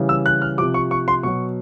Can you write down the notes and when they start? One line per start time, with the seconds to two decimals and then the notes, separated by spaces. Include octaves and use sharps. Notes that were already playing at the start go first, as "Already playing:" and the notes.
Already playing: C#3 E3 G3
0.09 E6
0.26 F#6
0.42 F6
0.58 C3 F3 D6
0.74 C#6
0.91 C#6
1.08 C6
1.23 B2 F#3 C#6